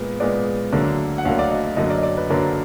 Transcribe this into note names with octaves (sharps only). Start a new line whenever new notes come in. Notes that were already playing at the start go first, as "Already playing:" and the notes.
Already playing: A#2 G#3 B3 B4
A#2 G#3 B3 D5
D2 D3 F#3 A#3
F#5
D2 D3 F#3 A#3 F5
D5
D#5
F#2 D3 F#3 A#3 D#5
D5
D#5
D5
B4
F#2 D3 F#3 A#3 A#4